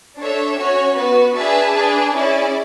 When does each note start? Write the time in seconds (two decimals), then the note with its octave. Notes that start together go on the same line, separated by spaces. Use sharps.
0.17 D4 A4 C#5 E5
0.56 C#4 F#4 C#5
0.95 B3 F#4 B4
1.35 D4 G#4 B4 E5 A5
1.74 D4 G#4 B4
2.14 C#4 E4 G#4 D5